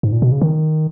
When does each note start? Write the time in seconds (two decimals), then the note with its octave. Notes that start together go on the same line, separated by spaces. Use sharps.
0.03 G#2
0.12 A#2
0.22 B2
0.32 C#3
0.41 D#3